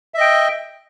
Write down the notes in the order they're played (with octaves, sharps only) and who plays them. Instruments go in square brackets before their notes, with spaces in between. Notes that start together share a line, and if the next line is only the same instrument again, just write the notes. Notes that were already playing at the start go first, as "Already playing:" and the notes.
[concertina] E5
D#5
G5